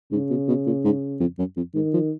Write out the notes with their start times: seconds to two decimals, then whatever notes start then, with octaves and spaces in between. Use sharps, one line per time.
0.12 G#2 C#3
0.30 B2
0.48 B2
0.66 A#2
0.85 G#2
1.20 F2
1.38 F#2
1.56 F2
1.74 G#2 D#3
1.94 F3